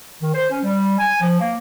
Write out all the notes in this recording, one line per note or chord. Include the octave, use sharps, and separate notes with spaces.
D#3
C5
C#4
G3
G#5
F3
A#3